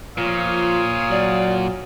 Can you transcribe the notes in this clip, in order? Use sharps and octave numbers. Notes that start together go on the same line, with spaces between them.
A#2 F3 F4 C#5 F5 D#6
F#3 D5